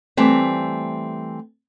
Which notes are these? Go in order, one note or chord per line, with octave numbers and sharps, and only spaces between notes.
E3 G3 A3 C4